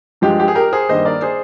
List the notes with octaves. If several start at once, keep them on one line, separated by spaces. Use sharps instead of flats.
G2 F3 G#3 G4
G4
G#4
G4 A#4
G#4 C5
G2 D#3 G3 A#3 C5 D#5
A#4 D5
G#4 C5